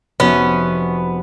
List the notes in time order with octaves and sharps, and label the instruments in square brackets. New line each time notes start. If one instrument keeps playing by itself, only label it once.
[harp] F1 F#4 [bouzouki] B3 [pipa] C#4